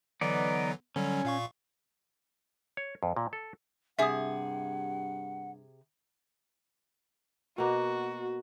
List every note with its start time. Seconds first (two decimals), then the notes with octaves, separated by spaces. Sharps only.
0.21 D3 E3 F#3 B3 D#4 D5
0.96 D3 F#3 G3 C#4
1.25 A#2 F5 C#6
2.77 C#5
3.03 F2
3.16 A#2
3.33 A4
3.99 G2 C3 G#4 E5 F#5 D#6
7.58 B2 A#3 F#4